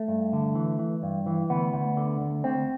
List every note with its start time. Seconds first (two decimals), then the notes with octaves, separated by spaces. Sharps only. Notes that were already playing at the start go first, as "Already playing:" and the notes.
Already playing: A3
0.08 G2
0.33 D3
0.55 E3
0.79 E3
1.03 G2
1.26 E3
1.50 D2 B3
1.74 D2
1.97 D3
2.20 D2
2.44 D2 C4